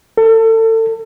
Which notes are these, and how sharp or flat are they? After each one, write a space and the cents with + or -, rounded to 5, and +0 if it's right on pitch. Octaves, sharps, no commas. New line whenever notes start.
A4 +30